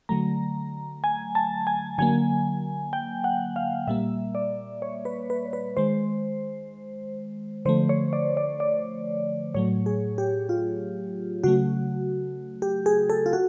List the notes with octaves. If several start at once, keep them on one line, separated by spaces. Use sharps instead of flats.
D3 F#3 A3 A#5
G#5
A5
G#5
D3 F#3 A#3 G#5
G5
F#5
F5
A#2 G3 A#3 E5
D5
C#5
B4
B4
B4
D#3 G#3 C5
D3 F3 A3 C5
C#5
D5
D5
D5
A2 F#3 A3 C#5
G#4
G4
F4
C#3 F#3 A3 F#4
G4
G#4
A4
F4
F#4